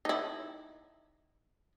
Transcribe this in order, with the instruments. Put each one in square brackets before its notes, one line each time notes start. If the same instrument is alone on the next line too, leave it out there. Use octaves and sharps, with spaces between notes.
[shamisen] D#4 E4